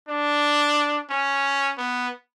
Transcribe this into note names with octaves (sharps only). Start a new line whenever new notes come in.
D4
C#4
B3